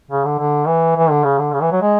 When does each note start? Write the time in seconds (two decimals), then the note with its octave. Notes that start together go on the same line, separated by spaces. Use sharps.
0.11 C#3
0.25 D3
0.38 D3
0.67 E3
0.96 E3
1.10 D3
1.24 C#3
1.39 D3
1.53 C#3
1.62 E3
1.72 F#3
1.81 G#3